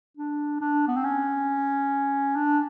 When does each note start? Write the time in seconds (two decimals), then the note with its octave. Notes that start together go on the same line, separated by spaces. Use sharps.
0.17 D4
0.61 D4
0.88 B3
0.96 C4
1.04 C#4
2.36 D4